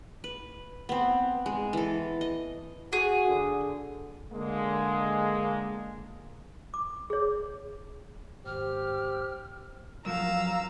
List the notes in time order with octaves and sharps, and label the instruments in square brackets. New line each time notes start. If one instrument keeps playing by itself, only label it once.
[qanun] B4
B3 C4
G#3
E3 A4
D#5
[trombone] F#4 [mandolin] G#4
[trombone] D3
[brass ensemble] D3 G#3 A#3
[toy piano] D6
G#4 C#5
[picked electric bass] G#1 [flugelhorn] G4 [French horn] C5 [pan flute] F6
[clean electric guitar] F#2 F3 F#3 [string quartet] F5 A#5 E6